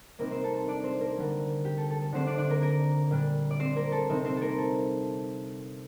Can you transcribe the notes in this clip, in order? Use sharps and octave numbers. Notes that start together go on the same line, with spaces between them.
C3 G3 A#3 C4 D#4 A#4
C4 C5
A4
A4
D4 D5
C4 C5
A#3 A#4
D3 G3 A#3
G4
A4
A4
A4
D3 A3 C4 D4 C5
D4 D5
D4 D5
A#3 A#4
A#3 A#4
A#2 G3 D4
D5
C4 C5
A#3 A#4
A4
C3 G3 C4 D#4
C4 C5
A#3 A4 A#4
A4